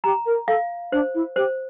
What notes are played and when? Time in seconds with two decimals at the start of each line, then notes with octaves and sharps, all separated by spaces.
0.04 G4 A#5
0.25 A#4
0.47 A4 F5
0.92 D4 C5
1.14 E4
1.36 G4 C5